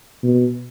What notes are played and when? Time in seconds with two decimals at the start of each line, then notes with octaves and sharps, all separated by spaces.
0.24 B2